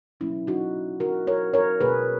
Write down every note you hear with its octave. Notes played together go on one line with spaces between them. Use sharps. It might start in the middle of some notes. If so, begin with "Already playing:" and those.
B2 F#3 A#3 C#4 E4
D#4 F#4
F#4 A#4
A#4 C#5
A#4 C#5
B2 A#3 G#4 B4